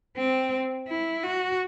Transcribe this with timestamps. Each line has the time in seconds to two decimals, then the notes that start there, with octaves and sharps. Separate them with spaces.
0.17 C4
0.88 E4
1.23 F#4